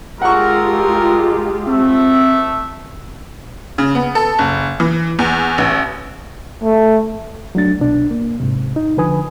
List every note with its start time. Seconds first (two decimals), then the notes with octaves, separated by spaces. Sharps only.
0.22 G#3 F4 G4 A4 A#4 F#5 C#6
1.67 A3 C4 E5
3.78 C#3
3.95 B3
4.15 A4
4.39 F#1
4.80 E3
5.19 E2
5.58 A1
6.63 A3
7.55 F#3 A3 D4 A6
7.79 C2 B2 B3 D4
8.11 A#3
8.40 G#2 C3
8.76 D#4
8.97 D3 F3 B4 G#5 D#6